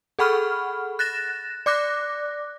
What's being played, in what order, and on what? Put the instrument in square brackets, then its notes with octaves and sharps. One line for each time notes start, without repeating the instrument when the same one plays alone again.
[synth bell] G#4 A4 F#5 B5 C#6 F6
F#6 A6 A#6 E7
D5 D6 F#6 A#6